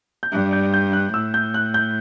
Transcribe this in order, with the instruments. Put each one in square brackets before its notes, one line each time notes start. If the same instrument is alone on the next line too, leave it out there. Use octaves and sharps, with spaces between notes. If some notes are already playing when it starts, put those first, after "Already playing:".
[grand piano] G6
[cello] G2 [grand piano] F#6
[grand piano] G6
G6
F#6
[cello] A2 [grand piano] E6
[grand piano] G6
F#6
G6